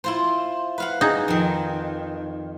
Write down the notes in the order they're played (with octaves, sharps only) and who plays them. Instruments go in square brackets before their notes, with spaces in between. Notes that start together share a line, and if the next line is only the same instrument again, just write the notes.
[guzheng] E4 F4 C5
B4 F5 F#5
[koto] D#4 G#4
[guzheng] F2 D#3